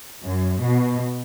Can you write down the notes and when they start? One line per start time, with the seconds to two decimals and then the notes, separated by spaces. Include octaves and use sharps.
0.24 F#2
0.63 B2